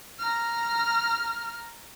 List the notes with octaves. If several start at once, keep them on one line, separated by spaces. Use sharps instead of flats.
A#5 F6